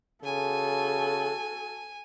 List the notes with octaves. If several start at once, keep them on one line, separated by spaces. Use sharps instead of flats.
C#3 F#4 A4 G#5